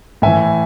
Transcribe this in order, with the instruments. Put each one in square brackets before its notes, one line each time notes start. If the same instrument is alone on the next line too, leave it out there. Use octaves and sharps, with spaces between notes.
[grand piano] A2 E3 E5 G#5